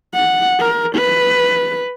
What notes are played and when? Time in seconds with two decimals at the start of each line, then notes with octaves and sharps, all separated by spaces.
0.14 F#5
0.60 A#4
0.96 B4